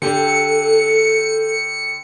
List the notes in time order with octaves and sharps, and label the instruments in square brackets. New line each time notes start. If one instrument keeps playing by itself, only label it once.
[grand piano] D3 G4 [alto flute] A4 [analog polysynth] C#7